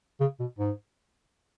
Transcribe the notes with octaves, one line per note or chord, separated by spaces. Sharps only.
C#3
B2
G#2